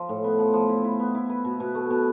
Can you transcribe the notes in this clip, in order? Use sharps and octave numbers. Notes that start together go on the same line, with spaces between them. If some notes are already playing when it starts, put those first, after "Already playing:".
Already playing: F3
A2
B3
F3
F3
E4
E4
B3
E4
B4
B2
B2
A3
B2